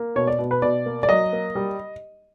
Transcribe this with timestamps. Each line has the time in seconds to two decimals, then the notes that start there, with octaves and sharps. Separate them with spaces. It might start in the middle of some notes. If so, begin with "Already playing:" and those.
Already playing: A#3
0.16 B2 C#5
0.27 D5
0.39 B2
0.51 B4
0.62 B2 D5
0.86 A#3
1.03 D5
1.09 F#3 D#5
1.33 A#3
1.55 G3